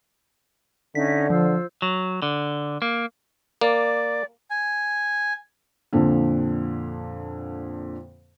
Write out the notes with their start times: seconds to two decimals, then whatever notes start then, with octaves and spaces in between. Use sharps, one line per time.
0.95 D3 C#4 D#4 E5 B6
1.30 F3 F4 C5 E6
1.82 F#3
2.22 D3
2.82 A#3
3.61 A#3 D5
4.50 G#5
5.93 F2 A#2 D3